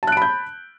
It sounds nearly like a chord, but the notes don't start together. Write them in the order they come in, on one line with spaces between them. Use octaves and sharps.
A5 F#6 D7 B5 G6